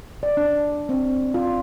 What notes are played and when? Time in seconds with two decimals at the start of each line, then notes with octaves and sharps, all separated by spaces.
0.23 D5
0.37 D4
0.89 C4
1.34 F4